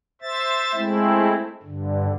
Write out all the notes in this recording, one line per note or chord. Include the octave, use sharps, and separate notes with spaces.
C5 E5 A6
G#3 A3 C4 E4
G2 D3